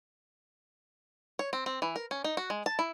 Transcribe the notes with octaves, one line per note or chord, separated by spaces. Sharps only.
C#5
C4
C4
E3
A#4
C#4
D#4
F#4
G#3
A5
E4